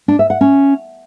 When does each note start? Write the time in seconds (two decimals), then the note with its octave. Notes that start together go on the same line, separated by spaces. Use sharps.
0.08 D4
0.19 E5
0.30 F#5
0.41 C#4